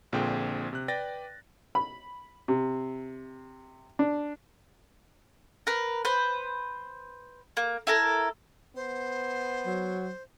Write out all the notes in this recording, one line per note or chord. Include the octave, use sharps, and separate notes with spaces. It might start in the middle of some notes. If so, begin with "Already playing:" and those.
A#1 A#2 D3 C4 G#4 G5
C3 F#6
B4 D5 G5 A6 A#6
B5
C3
D4
A#4 B4
B4 C5
A#3
E4 A4 A#4
B3 C5
F#3